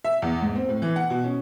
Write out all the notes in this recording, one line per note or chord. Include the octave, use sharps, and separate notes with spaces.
E5
E2
G#2
C4
A2
E3
F#5
B2
C#4